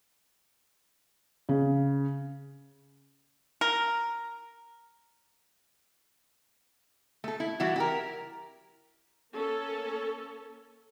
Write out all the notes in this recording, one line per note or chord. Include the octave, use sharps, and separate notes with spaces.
C#3
A#4
A3 A4
E4
E3 G3 E4 F#4
E4 G4 A#4
A#3 C#4 A4